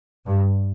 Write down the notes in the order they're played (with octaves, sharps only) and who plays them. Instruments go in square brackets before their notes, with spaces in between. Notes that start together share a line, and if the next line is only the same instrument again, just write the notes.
[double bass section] G2